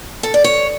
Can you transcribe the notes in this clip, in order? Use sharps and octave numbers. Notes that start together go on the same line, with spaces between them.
A4
D5
C#5